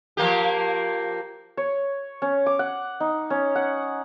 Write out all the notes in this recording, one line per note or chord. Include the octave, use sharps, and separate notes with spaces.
F3 A#3 G4
C#5
C#4
D6
F#5
D#4
C#4
F#5